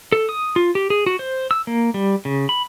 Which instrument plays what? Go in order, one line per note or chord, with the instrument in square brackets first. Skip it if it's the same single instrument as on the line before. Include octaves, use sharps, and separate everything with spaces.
[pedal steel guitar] A4
D#6
F4
G4
G#4
F#4
C5
E6
A#3
G3
C#3
B5